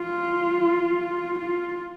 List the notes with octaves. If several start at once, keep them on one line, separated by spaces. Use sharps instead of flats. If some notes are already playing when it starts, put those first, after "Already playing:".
Already playing: F4
F4